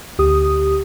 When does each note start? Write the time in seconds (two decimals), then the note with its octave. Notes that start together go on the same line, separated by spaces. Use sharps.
0.19 D2 G4 D#6